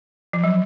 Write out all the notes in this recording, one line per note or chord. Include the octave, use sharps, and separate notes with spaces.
F3
F#3